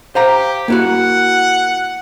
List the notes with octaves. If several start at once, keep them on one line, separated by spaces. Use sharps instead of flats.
G4 C5 F5 A#5
A#3 E4 F#4 F#5